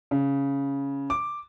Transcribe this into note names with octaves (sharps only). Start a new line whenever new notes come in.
C#3
D6